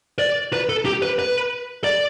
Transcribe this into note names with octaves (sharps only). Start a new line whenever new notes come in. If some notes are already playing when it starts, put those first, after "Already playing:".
D5
B4
A4
G4
B4
B4
D5